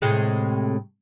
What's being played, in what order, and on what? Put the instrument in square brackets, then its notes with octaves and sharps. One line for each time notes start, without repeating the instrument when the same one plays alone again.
[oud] A2 C3 G#3